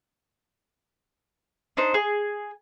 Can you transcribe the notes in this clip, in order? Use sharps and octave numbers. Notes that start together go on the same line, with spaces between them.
D4 D#4 C5
G#4